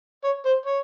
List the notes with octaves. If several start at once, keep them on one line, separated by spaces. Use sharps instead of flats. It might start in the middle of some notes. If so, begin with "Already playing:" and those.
C#5
C5
C#5